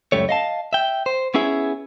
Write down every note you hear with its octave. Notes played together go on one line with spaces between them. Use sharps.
C#2 F#2 G3 A3 C#5
D#5 F5 A5
E5 G5
C5
B3 C#4 E4 G#4 E5